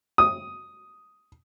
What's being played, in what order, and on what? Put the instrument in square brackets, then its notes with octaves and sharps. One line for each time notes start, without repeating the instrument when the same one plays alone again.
[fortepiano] D#6